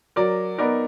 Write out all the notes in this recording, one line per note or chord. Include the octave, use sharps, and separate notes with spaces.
F#3 A#4 D5
B3 D#4 A#4 D5